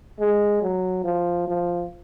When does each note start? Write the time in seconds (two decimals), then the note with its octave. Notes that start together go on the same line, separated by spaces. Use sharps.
0.20 G#3
0.62 F#3
1.04 F3
1.48 F3